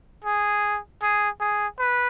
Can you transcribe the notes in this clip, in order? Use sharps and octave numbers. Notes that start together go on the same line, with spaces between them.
G#4
G#4
G#4
B4